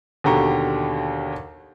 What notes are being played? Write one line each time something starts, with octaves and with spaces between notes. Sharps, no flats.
D#2 B2 D3 G4 A#5 C#6